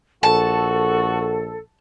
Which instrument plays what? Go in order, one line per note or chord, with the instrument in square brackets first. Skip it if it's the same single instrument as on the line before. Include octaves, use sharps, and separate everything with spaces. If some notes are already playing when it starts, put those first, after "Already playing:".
[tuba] A#1 [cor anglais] F#4 [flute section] A4 [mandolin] A5